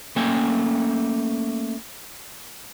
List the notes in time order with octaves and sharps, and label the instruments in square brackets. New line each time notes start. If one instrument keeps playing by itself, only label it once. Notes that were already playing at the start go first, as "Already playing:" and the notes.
[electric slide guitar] A3 A#3 C#4 G5 G#5